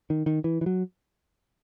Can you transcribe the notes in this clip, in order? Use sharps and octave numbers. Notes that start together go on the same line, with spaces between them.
D#3
D#3
E3
E3
F#3